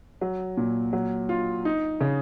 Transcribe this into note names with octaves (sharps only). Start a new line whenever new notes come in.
F#3
A#2
F#3
F4
D#4
C#3